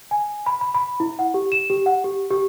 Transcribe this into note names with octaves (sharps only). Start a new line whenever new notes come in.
G#5
B5
B5
B5
E4
F#5
G4
E7
G4
F#5
G4
G4